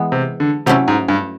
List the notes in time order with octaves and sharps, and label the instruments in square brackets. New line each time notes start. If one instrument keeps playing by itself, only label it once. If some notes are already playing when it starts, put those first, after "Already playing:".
Already playing: [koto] E3 G#3 B3
[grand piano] C3
D3
[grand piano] C3 [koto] F#3 A3 C#4 E4
[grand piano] G#2
G2